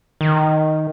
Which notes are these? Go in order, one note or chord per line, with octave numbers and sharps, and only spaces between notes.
D#3